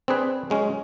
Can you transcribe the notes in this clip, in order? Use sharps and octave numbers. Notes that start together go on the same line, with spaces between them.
C4 D4 G#4 B4
F#3 G#3 C#4